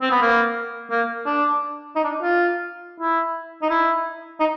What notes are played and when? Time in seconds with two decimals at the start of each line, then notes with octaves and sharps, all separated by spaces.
0.02 C4
0.11 B3
0.22 A#3
0.91 A#3
1.26 D4
1.96 D#4
2.04 D4
2.22 F4
3.00 E4
3.62 D#4
3.70 E4
4.40 D#4